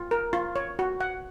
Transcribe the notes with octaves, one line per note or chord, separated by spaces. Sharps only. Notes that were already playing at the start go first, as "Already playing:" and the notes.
Already playing: F4
A#4
F4
C#5
F#4
F#5